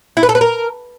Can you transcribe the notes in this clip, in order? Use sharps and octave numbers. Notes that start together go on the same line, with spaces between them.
E4
B4
A4
B4
A#4